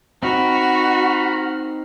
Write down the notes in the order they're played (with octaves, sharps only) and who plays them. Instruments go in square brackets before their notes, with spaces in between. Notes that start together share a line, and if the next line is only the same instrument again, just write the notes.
[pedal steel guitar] C4 D#4 A#4 [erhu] F#4 [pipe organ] A#5 B5 F6